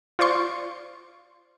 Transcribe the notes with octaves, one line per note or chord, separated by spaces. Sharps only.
F4 C5 D5 C6 C#6